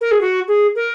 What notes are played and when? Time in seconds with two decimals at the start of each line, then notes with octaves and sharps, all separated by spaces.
0.01 A#4
0.11 G#4
0.21 F#4
0.48 G#4
0.76 A#4